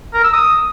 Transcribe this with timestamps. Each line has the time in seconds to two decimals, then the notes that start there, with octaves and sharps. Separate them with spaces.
0.14 A#4
0.24 E6
0.33 D#6